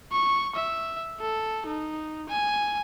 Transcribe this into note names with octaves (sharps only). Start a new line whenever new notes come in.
C#6
E5
A4
D#4
G#5